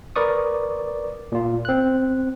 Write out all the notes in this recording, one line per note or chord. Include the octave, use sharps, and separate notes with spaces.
A#4 B4 D5 C#6 D#6
A#2 F4
C4 F#6